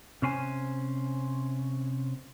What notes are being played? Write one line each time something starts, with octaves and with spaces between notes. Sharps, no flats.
C3 C#4 C5 G#5